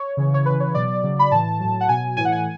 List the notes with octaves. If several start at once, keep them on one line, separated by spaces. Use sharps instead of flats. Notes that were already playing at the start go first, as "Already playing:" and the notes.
Already playing: C#5
C#3 E3
C#5
C#3 E3 B4
C#5
B2 F#3 D5
C#3 F#3
B5
A2 E3 A5
A2 F#3
F#5
B2 F#3 G#5
A2 E3 G#5
F#5
G#5